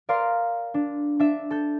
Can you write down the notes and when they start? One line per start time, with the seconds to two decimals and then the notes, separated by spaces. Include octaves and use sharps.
0.09 A#4 D5 F5 A#5 C6
0.74 D4
1.19 D4 E5
1.51 A4 G6